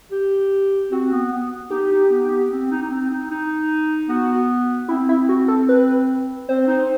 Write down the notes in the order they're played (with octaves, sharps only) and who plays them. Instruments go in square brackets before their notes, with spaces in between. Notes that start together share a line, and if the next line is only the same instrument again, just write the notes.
[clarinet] G4
[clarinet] C4 [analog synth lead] F#4
[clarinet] B3
B3
[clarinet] D#4 [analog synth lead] G4
[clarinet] D#4
B3
B3
C4
D#4
D#4
C4
D#4
D#4
[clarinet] B3 [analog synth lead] F#4
[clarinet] C4 [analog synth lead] E4
[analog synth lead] E4
F#4
A4
B4
[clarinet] C4 [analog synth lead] C5
[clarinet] D#4